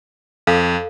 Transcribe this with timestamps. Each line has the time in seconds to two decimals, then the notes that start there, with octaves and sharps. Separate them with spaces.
0.47 F2 A4 F5